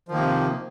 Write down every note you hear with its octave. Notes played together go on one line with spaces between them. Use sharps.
C3 D#3 F3 A#3